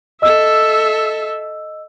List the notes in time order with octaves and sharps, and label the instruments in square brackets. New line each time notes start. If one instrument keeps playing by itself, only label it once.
[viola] A4 E5 [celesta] D#5 E6